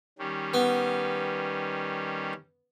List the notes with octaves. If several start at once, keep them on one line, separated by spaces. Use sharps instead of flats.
D#3 G3 C#4
B3